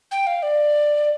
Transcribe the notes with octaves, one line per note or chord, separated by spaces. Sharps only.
G5
F5
D5